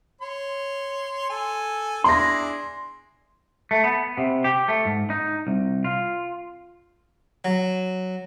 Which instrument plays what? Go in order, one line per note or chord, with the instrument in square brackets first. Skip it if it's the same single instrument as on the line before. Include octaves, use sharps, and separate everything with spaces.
[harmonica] C#5 C6
A4 G#5
[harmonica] D4 E4 G#4 [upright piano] C6 A#6
[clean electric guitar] A3
B3
C3
G4
A3
G#2
D#4
C2
F4
[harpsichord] F#3